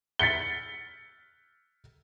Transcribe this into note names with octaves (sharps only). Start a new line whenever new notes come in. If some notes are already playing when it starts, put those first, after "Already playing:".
A6 B6 C#7 G7